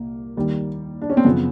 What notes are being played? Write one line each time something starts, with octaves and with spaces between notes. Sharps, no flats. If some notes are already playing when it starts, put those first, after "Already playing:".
Already playing: C2 A#2 A#3
D#2 D#3 G3
D4
C#4
C4
F#2 C#3 F3 B3